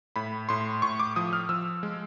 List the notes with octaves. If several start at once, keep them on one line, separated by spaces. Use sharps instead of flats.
A2 B5
A2 C6
A2 C#6
D6
F3 D#6
F6
F3 E6
G#3